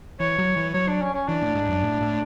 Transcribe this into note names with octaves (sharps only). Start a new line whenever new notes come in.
E3 C#5
F#3
E3
F#3 C#5
D4
C#4
C#4
E3 D4
A2
G#2
F#2
A2
A2